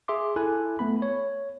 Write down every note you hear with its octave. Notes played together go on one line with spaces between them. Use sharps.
G#4 E5 C6 D6
E4 A4 G#5 F#6
A3 B3 B5
C#5